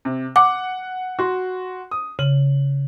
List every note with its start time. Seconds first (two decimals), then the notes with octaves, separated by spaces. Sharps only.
0.05 C3
0.36 F#5 D6
1.19 F#4 C6
1.91 D#6
2.19 C#3 F#7